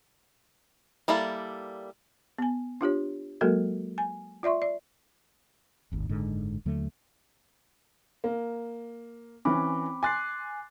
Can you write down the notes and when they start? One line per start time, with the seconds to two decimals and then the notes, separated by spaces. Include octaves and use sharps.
1.08 G3 A#3 E4 A4
2.38 B3 G#5
2.81 D4 F4 G4 C#5
3.41 F#3 G#3 A#3 F#4 A4 A#4
3.98 G#5
4.43 F4 D5 E5 C6 C#6
4.62 D5
5.92 D1 G#1 D#2
6.09 F#1 G#2 D3 G#3
6.65 D#2 D3 F#3 A3
8.24 A#3
9.45 E3 C4 C#4 B5 D6
10.03 G#5 C6 D6 F#6 A6 C7